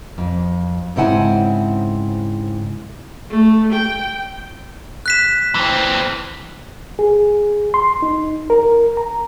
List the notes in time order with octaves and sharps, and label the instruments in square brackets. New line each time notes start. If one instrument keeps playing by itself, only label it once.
[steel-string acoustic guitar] F2
G#2 C#3 C4 E4 F#5 G#5
[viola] A3
G5
[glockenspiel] F#6 B6 E7
[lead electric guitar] E3 C4
[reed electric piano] G#4
C6
D#4
A#4
A#5